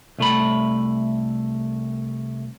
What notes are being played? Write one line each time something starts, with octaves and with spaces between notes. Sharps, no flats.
C2 A3 B5